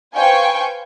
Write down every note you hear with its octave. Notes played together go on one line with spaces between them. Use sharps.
B4 C5 F5 G5 G#5 C#6